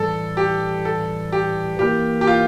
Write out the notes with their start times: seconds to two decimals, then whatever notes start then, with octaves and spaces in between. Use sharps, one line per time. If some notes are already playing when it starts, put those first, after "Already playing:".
Already playing: A2 E3 G3 A4
0.37 G4
0.85 A4
1.32 G4
1.79 E3 A#3 E4 G4 A#4
2.21 G4
2.27 F4